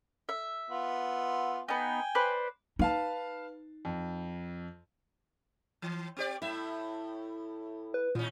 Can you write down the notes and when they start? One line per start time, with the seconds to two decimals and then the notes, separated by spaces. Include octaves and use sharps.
0.29 E5
0.71 B3 F4
1.69 B3 D#4 G5 G#5
2.15 B4 C5 D5
2.79 D#4 B4 F5 A5
3.85 F2
5.82 E3
6.17 C4 G4 D5
6.42 A2 E4 E5
7.94 B4
8.15 D#2 A#2 C#4